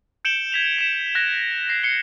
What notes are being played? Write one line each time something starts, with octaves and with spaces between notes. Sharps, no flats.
G6 C#7 D7 E7 F#7 G7
G#6 B6 F7
B6 E7
F#6 G#6 A#6
A#6 C7
C7 C#7 G7